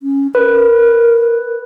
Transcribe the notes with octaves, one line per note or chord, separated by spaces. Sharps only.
C#4
A#4 B4